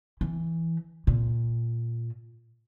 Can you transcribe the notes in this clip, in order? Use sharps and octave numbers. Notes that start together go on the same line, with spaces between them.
E3
A#2